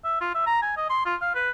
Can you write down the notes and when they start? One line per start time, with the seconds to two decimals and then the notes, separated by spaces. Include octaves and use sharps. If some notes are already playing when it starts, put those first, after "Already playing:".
0.04 E5
0.21 F4
0.35 E5
0.46 A#5
0.62 G#5
0.77 D#5
0.90 C6
1.06 F4
1.21 F5
1.35 B4